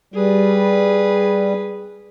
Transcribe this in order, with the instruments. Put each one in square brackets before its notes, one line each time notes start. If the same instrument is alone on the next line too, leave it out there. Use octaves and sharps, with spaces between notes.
[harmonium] G3 [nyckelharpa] G#4 B4